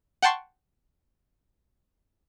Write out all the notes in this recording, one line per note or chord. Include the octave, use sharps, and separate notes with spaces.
F#5 G5 A5 C6 C#6